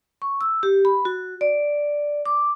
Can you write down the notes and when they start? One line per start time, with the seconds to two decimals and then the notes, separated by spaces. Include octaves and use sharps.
0.22 C#6
0.41 E6
0.63 G4
0.85 B5
1.05 F#4
1.41 D5
2.26 D6